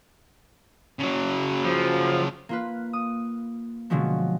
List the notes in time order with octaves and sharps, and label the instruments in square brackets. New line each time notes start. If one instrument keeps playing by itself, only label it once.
[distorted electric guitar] C#3 F#3
[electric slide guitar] F3
[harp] A#3 F4 B4
D#6
B2 D3 F3 F#3 G#3 B3